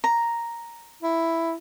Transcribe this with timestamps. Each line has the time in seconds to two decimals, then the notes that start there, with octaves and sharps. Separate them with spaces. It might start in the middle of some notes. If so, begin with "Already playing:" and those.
0.04 A#5
1.02 E4